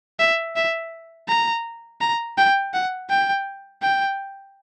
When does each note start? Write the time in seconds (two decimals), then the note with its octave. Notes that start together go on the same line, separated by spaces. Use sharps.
0.19 E5
0.56 E5
1.28 A#5
2.01 A#5
2.38 G5
2.73 F#5
3.09 G5
3.82 G5